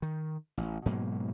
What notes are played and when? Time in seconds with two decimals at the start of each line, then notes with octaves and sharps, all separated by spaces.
0.02 D#3
0.57 A1
0.86 G#2 B2 F#3 A#3